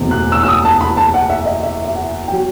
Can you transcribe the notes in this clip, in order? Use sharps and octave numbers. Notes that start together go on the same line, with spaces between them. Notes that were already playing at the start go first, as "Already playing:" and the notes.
Already playing: F#1 E2 B2 A3 C4
F#6
E6
E6
D#6
A5
B5
A5
F#5
E5
D#5
E5
E5
F#5
G5
F#3